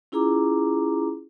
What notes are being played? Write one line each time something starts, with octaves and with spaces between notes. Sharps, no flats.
C#4 E4 F4 G#4 A#5 D6